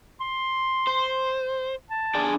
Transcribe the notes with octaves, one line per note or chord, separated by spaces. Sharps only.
C6
C5
A5
D4 G#4 D5